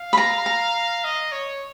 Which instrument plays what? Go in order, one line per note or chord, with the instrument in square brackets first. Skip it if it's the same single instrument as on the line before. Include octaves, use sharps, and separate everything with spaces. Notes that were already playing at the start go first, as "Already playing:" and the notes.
Already playing: [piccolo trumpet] F5
[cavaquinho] B5
A#5
A#5
[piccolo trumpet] D#5
C#5